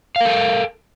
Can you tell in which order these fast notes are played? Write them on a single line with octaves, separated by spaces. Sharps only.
F5 A#4 A4 G5